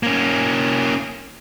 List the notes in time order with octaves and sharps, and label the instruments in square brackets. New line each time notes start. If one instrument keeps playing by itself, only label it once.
[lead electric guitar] A#3 C#4